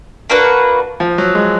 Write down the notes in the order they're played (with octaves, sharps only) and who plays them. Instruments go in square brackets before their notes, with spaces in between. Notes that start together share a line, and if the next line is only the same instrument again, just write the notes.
[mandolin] A#3 D4 F#4 B4
[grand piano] F3
F#3
G#3